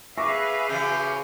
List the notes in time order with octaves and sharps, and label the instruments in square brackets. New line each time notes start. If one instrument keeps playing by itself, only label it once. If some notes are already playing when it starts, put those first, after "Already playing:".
[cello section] G#4 B4 F5 [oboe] E5 [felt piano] C#6 D6 A#6
[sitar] C#3 E3 F#3 [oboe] G4